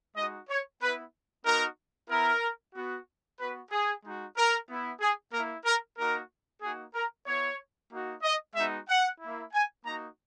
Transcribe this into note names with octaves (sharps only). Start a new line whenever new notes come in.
G#3 D#4 F#4 D#5
C#5
B3 E4 B4
B3 D#4 F#4 A#4
B3 E4 A#4
B3 F#4
B3 F#4 B4
G#4
G#3 D#4 F#4
A#4
B3 E4
G#4
A#3 E4 A#4
A#4
A#3 D#4 F#4 A#4
A#3 D#4 F#4 G#4
A#4
B3 E4 C#5
A#3 D#4 F#4
D#5
G#3 B3 D#4 F#4 E5
F#5
A#3 E4
G#5
A#3 D#4 F#4 A#5